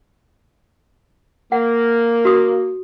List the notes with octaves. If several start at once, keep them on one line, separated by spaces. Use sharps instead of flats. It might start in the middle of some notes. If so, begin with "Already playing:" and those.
A#3 F#5
F#4 D#6